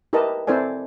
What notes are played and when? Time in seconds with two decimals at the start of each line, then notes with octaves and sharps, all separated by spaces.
0.13 E4 G4 A#4 B4 D#5 A5
0.47 C4 E4 A4 C5 D5 G#5